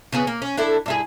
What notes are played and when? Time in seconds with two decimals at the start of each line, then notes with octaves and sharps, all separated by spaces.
0.12 C#3 B3 G#4
0.27 A#3
0.42 C#4
0.57 D4 E4 A4
0.86 G2 E4 G#4